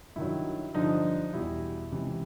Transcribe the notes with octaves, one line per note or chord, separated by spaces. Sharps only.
G2 D#3 F#3 E4
G2 D3 F3 D#4
E2 B2 G3 E4
C#2 C3 E3